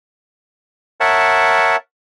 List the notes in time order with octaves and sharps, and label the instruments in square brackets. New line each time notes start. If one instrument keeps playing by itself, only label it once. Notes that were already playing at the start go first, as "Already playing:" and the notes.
[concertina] A#4 C#5 E5 F#5 A5